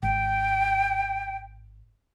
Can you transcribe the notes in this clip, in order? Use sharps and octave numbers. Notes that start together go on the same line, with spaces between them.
G#1 G5